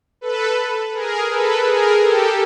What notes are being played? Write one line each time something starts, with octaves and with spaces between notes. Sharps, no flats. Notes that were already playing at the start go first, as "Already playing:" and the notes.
A4 B4
G#4 A#4
A4 B4
G#4 A#4
G4 A4